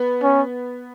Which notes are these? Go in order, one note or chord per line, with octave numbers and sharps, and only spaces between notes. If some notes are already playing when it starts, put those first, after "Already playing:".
Already playing: B3
C#4